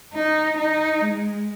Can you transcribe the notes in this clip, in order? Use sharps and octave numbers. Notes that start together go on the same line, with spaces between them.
D#4
D#4
G#3